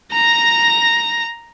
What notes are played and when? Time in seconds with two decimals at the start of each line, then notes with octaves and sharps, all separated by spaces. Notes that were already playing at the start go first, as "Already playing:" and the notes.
0.12 A#5 A#6